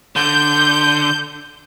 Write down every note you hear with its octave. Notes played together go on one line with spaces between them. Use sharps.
D3 G6